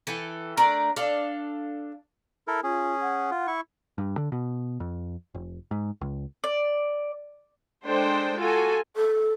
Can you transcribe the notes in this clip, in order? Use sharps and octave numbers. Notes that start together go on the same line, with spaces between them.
E3 A4 G5
A3 D4 A#4 D5
D4 A4 F5
E4 A4 A#4
C#4 F4 G#4
F#5
F4
E4 C#6
G2
D3
B2
F2
F1
G#2
C#2
D5
G#3 D4 A4 C5 G5
F4 F#4 A4 G#5
A4